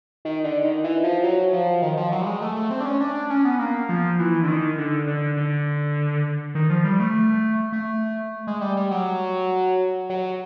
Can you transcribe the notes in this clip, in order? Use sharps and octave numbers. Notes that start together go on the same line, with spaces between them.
D#3
D3
D#3
E3
F3
F#3
F3
D#3
F3
F#3
G3
G#3
A3
A3
C4
D4
C#4
D4
D4
C#4
B3
A#3
F3
E3
D3
D#3
D3
D3
D3
D#3
F3
G3
A3
A3
G#3
G3
G3
F#3
F#3